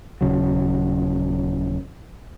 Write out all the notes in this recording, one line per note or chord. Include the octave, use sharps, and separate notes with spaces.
D#1 C#3 F#3